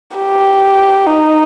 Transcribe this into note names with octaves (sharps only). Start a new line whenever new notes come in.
G4
D#4